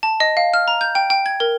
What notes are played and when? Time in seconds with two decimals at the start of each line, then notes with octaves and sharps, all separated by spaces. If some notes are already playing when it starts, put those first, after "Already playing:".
0.03 A5
0.20 D#5
0.37 F5
0.54 F6
0.68 A#5
0.81 G6
0.95 G5
1.10 G5
1.26 G#6
1.40 A#4